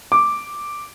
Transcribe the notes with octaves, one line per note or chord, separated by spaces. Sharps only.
D6